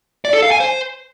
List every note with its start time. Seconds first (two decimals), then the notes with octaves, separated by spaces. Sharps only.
0.25 D5
0.34 A4
0.42 F5
0.51 G#5
0.60 C5